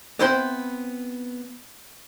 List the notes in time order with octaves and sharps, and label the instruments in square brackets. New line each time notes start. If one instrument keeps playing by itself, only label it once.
[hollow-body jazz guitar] B3 C4 E4 C5 C6